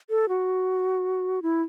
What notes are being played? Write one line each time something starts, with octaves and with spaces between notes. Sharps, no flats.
A4
F#4
E4